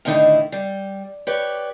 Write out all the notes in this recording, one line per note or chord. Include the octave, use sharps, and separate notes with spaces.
A2 D3 D#3 D#4 E4
G3
G4 B4 C#5 D5